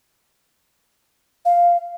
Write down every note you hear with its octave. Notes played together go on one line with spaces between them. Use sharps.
F5